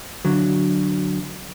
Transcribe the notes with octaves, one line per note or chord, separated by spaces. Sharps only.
D3 F#3